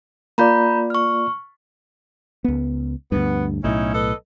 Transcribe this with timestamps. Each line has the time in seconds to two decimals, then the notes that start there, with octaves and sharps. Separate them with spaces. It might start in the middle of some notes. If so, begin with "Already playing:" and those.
0.38 A#3 F4 D5 A#5 B5 G6
0.90 C#6 F6
2.44 C#2 B3
3.12 D2 G2 B3
3.64 B1 A2 C#4 D#4 E4
3.94 A4 B4 D#5